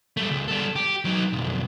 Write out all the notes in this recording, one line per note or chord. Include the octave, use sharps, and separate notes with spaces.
G3 A3
C#2
G3 A4
G4
F#3 D#4
B1 F2